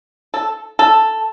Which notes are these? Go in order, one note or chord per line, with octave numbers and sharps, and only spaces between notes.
A4
A4